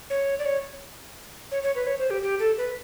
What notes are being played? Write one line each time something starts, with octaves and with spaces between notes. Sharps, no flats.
C#5
D5
C#5
C#5
C#5
B4
C#5
C5
G4
G4
A4
B4